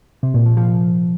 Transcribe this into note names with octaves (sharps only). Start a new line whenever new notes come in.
C3
A#2
F3
F3